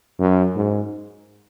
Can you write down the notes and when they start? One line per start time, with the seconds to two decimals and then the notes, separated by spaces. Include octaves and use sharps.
0.19 F#2
0.56 G#2